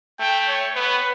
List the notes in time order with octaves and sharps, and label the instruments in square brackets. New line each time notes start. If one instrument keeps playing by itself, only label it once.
[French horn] A3 [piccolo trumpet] G5
[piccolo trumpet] C#5
[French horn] B3 [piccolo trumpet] B4